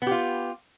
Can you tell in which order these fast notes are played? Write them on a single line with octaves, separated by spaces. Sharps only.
B3 G4 F4